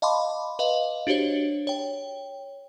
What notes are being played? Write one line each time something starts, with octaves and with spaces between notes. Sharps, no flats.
D#5 F5 A5 B5 C6 D6
B4 D#5 F5
D4 F#4 G4 C5 C#5
C#5 G5